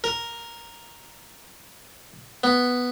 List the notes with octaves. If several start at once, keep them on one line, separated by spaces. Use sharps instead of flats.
A#4
B3